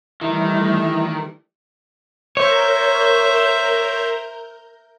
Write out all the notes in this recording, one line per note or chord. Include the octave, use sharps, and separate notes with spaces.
D#3 E3 G3 A3 E4
A#4 C5 C#5 E5 G6